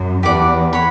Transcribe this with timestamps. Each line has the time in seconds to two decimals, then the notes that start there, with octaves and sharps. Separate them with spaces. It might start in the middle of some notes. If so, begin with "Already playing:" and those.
Already playing: F#2
0.23 E2 G4 B4 D5 F#5
0.73 C#5 F#5 B5